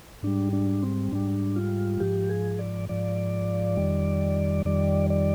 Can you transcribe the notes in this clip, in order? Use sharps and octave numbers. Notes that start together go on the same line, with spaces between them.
G#2 G3 D4
D4
C4
G#2 G3 D4
F4
G#2 F3 G4
G#4
D5
G#2 F3 D5
F2 D#3 G3
F2 D#3 G3 D5
D5